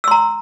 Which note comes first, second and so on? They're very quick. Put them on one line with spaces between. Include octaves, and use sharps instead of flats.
E6 C6 A#5